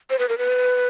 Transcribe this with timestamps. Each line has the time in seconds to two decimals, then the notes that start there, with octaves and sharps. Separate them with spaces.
0.10 C5
0.19 B4
0.29 A#4
0.38 B4